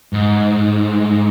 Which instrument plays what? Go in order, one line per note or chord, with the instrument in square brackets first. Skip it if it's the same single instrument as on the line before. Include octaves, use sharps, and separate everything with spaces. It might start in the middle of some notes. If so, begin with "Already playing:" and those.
[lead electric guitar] G#2